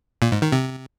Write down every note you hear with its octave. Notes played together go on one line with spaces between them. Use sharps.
A#2
G#2
D#3
C3